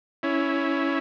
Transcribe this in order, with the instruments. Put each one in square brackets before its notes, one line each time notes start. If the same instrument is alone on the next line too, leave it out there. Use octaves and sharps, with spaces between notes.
[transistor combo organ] C#4 E4